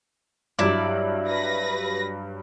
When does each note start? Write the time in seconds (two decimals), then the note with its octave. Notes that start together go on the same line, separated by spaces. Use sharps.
0.59 G2 F#3 G3 E4 D5
1.28 B4 A#6